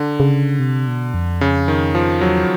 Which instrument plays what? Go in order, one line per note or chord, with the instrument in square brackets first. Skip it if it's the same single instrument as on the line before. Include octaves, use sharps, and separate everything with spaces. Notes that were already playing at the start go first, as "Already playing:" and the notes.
Already playing: [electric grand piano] D3
[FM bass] C#3
C3
B2
F2
[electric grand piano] C#3
D#3
F3
[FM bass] E2 [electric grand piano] F#3